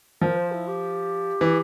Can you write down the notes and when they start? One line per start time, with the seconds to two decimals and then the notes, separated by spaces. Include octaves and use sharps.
0.21 F3 A#4
0.36 C5
0.52 E4
0.67 G4
1.41 E3